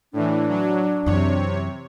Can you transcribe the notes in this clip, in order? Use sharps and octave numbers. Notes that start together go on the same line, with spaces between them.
A2 E3 D4
F#3
F#2 C3 E3 C#5